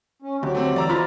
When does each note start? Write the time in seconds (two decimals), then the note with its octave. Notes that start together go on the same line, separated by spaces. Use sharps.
0.22 C#4
0.43 D2 F#3 G4
0.55 A3 C4
0.76 E2 D5 A#5 E6
0.90 B2 F4 C5 A#5 B5 F6 A6